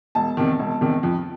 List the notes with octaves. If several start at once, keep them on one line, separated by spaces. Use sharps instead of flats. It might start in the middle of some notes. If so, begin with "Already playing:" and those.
E1 A5
E2 C3 D#3
E1
E2 C3 D#3
F2